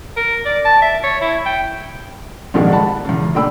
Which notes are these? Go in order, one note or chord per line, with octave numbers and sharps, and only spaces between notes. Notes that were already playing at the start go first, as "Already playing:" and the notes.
A#4
D5
A5
E5
C#5
E4
G5
A#1 G#2 D3 D#3 G3 G#3
F#5 A5 B5
E2 C#3
A#2 A3 D4 G5 B5 E6